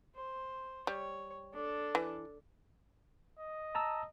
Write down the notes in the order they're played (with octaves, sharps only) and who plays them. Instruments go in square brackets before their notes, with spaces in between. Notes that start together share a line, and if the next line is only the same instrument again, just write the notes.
[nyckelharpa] C5
[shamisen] G3 [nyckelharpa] C#5
[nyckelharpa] D4 A4
[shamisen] E3
[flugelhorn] D#5
[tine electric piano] A5 A#5 E6